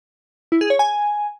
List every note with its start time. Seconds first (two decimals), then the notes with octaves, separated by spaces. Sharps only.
0.52 E4
0.61 G#4
0.70 C#5
0.79 G#5